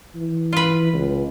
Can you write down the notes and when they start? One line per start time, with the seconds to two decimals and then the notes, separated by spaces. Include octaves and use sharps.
0.16 E3
0.53 F4 B4
0.93 C#2